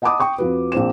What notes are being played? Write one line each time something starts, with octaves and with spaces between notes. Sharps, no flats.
D#5 F#5 A5 B5 D6 D#6
G5 C#6 D#6
F2 F3 F#4 B4
A#1 C4 C5 E7